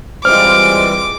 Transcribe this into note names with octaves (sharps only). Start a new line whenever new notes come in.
E3 G3 G#3 C4 F4 D6 F6